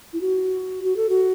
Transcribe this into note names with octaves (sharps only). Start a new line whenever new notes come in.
E4
F#4
F#4
A4
F#4